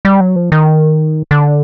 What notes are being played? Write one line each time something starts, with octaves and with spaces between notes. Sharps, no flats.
G3
F#3
F3
D#3
D3